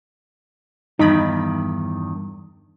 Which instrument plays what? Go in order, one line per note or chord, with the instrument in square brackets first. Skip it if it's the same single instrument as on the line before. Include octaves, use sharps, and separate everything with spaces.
[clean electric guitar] E2 G2 D#3 [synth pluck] D#4 B5